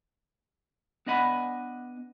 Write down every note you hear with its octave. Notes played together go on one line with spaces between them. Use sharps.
B3 D4 D#5 F#5 G#5 B5